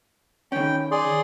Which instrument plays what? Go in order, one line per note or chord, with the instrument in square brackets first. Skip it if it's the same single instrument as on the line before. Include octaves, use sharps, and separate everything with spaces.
[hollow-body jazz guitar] D#3 C#4 [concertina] G5
[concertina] G#4 D5 C6